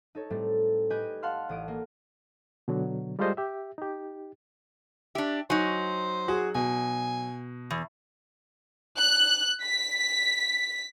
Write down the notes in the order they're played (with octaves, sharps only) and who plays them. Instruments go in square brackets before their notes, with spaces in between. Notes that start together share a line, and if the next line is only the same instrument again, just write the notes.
[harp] D#4 A4 C#5
A2 G3 A3 C4
G4 B4 D#5 G#5 D#6 G6
F5 F#5 A5 C6 F6
A1 D#6 D7
A#3
[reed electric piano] B2 D3 F#3
G3 G#3 F4 A4 C5 D#5
G4 E5
D#4 G4
[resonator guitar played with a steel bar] D4 G4 [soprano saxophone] E5
[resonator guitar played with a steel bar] F#3 D#4 [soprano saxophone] C5 [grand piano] G#5
[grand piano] F#4 G#4
[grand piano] B2 [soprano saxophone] G#5
[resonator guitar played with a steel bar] E2
[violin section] F#6
B6